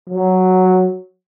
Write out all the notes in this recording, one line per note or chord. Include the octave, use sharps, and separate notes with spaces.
F#3